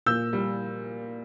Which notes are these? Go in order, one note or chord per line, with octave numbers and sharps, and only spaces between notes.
A#2 E6 G6
G3